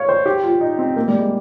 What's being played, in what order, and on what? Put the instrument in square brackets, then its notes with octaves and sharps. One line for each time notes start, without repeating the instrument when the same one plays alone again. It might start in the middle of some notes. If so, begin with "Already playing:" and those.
Already playing: [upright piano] C#5 F5
C5
G4
F4
D#4
C4
A#3
G3
G#3